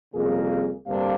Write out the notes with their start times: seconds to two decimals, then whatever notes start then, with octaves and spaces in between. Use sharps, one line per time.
0.15 C2 F2 C#3 A#3 G#4
0.87 D2 G2 C3 A#3 D4 F5